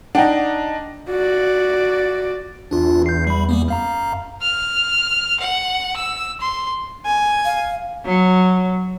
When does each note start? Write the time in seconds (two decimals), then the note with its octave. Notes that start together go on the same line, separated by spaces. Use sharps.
0.15 D4 D#4 F#5 G5
1.10 F#4 D5
2.71 E2 D4 F4
3.06 G6 C7
3.27 G3 B5
3.49 G3 A#3 B3
3.68 F#2 F5 A#5
4.42 F6
5.40 F#5
5.96 E6
6.40 C6
7.05 G#5
7.45 F5
8.05 F#3